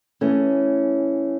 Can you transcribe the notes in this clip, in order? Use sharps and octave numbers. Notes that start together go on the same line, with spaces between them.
E3 A3 C#4